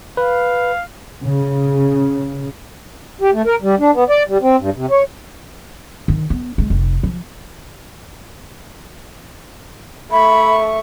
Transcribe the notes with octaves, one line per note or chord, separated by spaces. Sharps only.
B4 F5
C#3
G4
A3
A#4
G3
D4
B3
D5
G3
C4
G2
C3
C#5
D#3
B3
G#3
F1
F3
A3 E5 B5 C#6